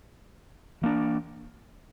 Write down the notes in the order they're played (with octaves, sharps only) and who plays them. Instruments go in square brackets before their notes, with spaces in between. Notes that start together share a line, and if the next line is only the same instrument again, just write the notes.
[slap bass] E3 A#3 D4